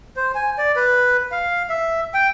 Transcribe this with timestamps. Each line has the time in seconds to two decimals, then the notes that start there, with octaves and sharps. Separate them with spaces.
0.16 C5
0.35 G#5
0.58 D5
0.76 B4
1.31 F5
1.69 E5
2.14 G5